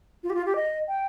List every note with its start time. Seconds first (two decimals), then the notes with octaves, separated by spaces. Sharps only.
0.23 F4
0.30 G4
0.34 F4
0.46 G4
0.56 D#5
0.88 G5